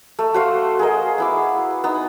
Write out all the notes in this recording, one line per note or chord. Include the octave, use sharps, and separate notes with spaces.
A3
F#4 C5 F5
G#4 A#4 D#5
B3 E4 D6
B3 D#4